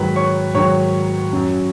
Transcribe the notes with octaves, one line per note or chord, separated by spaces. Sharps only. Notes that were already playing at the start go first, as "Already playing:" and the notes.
Already playing: G#2 D#3 F#3 B4 B5
C#5 C#6
G#2 D#3 F#3 C#5 C#6
F#2 F#3